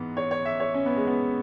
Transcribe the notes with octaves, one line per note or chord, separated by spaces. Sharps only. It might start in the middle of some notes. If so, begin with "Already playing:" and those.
Already playing: G#2 E3 B3
C#5
C#5
E5
C#5
C#4
B3
G#3
B3